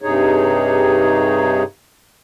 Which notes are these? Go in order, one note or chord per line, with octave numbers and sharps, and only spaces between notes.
G2 C3 D#4 G#4 C#5